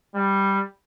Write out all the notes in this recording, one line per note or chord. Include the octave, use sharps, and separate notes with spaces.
G3